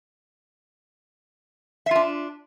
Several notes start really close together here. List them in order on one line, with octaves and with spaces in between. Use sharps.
E5 F4 D4